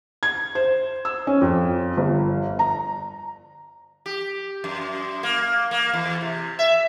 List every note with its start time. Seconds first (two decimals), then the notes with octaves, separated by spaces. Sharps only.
0.23 G#6
0.55 C5
1.05 E6
1.27 C#4
1.41 F2
1.97 G1
2.59 A#5
4.06 G4
4.64 F#2
5.23 A#3
5.71 A#3
5.93 E2
6.21 C3
6.59 E5